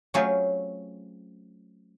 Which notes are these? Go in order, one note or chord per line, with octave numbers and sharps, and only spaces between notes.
F#3 A3 C4 C#4 F4 G#4